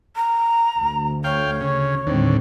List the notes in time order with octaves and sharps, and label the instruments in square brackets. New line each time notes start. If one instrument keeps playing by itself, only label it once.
[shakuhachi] A#5
[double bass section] D2
[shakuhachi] C#5 [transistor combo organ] F5 G5
[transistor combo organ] C#3
[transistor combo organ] D#2 D3 [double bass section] A2 G3 C4